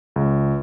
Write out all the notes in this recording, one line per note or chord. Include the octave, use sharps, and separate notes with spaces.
C#2